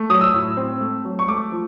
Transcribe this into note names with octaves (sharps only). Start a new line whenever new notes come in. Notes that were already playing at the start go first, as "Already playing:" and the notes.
Already playing: A3
F#3 D#6
E6
A2
C4
A3
F#3
C#6
A3 D6
F3